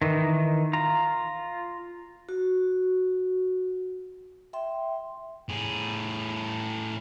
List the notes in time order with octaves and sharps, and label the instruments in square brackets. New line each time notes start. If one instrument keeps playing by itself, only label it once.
[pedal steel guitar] D#3 E3
F4 A#5
[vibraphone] F#4
E5 G5 C6
[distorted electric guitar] A2 G#4